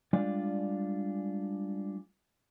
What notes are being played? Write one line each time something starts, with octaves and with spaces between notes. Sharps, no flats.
G3 G#3 D4 F4 D5